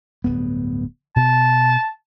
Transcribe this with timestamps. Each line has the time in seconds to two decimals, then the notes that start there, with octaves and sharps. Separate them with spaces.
0.24 D1 G2 B3
1.16 B2 A5